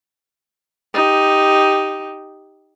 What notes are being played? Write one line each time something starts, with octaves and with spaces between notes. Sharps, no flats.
D#4 G4